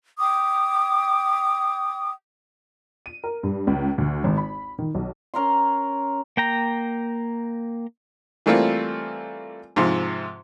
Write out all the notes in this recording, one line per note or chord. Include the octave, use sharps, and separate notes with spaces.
G5 D6 D#6
D#7
A#4
G2
C#2
D2
G#1
B5
D#3
B1
C#4 A#4 A#5 C6
A#3 G5 A#5
E3 G3 A3 A#3 C4 F4
G#2 C3 F3